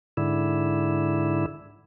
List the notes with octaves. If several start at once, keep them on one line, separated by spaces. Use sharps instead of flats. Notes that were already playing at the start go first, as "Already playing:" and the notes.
G#2 D3 E4